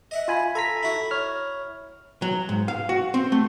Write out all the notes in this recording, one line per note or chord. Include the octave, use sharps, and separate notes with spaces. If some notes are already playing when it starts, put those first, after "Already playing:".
D#5 E5 F#5
F4 G#5 B5
A4 G#5 A#5 B6
E4 F#4
C#5 F6
F#3
G#2
F5
F#4
C4
A3